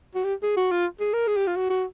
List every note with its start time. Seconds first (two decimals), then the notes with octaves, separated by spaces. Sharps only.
0.15 F#4
0.25 G4
0.43 G#4
0.57 F#4
0.71 F4
1.00 G#4
1.13 A#4
1.28 G#4
1.37 G4
1.47 F4
1.56 F#4
1.70 F#4